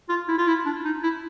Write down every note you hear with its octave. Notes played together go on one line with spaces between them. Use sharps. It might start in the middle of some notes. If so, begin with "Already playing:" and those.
F4
E4
F4
E4
D4
D#4
E4